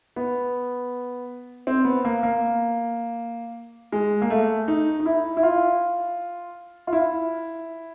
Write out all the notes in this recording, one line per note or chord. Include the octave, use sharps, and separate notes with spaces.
B3
C4
B3
A#3
A#3
G#3
A#3
A3
D#4
D#4
E4
E4
F4
F4
E4